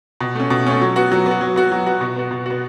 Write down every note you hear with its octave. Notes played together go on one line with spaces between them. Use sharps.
B2
A3 C#4
B2
A3 C#4
F#3
B3 F#4
F#3
B3 F#4
F#3
B3 F#4
F#3
B3 F#4
B2
B3 F#4
B2
B3 F#4